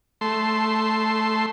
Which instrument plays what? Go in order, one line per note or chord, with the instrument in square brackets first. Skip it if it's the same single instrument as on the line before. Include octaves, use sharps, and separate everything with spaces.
[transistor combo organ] A3 C6